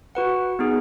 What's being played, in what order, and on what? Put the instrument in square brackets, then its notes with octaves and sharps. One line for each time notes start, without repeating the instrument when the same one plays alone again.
[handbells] F#4 B4 F#5
B3 D#4 G#4